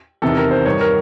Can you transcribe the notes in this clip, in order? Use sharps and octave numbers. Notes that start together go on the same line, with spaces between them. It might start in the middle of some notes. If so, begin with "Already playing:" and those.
E2 C3 D#3 A4
A#4
C5
G2 D#3 C#5
A#4